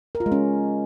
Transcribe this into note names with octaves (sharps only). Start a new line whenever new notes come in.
A#4
F4
G#3
C#4